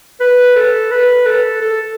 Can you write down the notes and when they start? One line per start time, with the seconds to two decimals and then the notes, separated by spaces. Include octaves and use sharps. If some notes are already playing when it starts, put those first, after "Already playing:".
0.20 B4
0.56 A4
0.91 B4
1.26 A4
1.61 A4